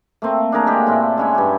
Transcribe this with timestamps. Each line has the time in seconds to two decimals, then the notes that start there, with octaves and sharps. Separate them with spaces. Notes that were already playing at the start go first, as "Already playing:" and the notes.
0.22 A3 A#3 C4
0.52 D4 G#4 A#4 C#5
0.67 G#3 A#3 G4
0.87 A2 C3 E4 F4
1.18 G#3 C#4 E4
1.35 G2 G4